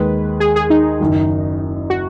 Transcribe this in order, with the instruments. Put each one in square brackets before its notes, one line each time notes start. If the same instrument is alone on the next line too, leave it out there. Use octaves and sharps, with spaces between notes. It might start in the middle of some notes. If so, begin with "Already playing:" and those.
Already playing: [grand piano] D#2 D#3 G#3 [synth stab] B4
[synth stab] G#4
G#4
D#4
[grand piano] F#1 F#2 D#3 F#3
[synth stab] F#4